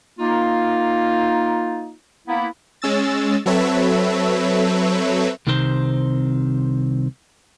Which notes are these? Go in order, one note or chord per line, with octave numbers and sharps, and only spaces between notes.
A#3 D#4 F4
A#3 B3 E4
G#3 C#4 E6 A6
F#3 C4 A4 B4 C#5 E5
C2 C3 D#3 C4 C5